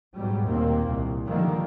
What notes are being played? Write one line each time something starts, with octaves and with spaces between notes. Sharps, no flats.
G#2 B2 F#3 G3
D#2 A#2 D#3 A#3 C4
C2
D3 D#3 F3 G3 A#3